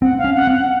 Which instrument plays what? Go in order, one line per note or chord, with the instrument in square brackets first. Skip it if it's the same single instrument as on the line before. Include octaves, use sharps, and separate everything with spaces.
[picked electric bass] C4 [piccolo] F#5
[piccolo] F5
[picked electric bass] C#4
[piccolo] F#5
[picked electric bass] C4
[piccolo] F#5